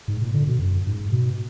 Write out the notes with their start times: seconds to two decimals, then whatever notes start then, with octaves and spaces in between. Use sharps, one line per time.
0.08 G#2
0.22 A#2
0.34 D3
0.47 B2
0.60 F#2
0.87 G#2
1.12 B2